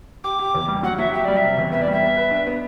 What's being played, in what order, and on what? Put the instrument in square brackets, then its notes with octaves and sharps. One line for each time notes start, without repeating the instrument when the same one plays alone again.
[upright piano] G4 [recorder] D6
[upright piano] G4
E2
G3
[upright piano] F#3 [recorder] F#5
[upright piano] F#3 [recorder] E5
[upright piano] G4 [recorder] E5
[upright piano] G3 [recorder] D5
[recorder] E5
[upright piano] C3
E2
[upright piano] B3 [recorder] E5
[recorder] D5
[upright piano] G3 [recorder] E5
[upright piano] B3
B4
D4
B3